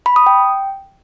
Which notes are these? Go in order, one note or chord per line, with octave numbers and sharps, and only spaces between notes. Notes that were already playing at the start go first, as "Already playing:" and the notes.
B5
D#6
G5